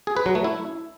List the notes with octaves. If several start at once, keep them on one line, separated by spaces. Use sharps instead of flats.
G#4
B4
F#3
A3
E4